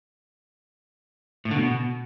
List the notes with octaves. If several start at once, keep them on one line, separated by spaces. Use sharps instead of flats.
A2
D3
B2